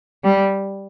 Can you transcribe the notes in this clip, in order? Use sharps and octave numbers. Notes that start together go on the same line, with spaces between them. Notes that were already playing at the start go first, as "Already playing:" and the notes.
G3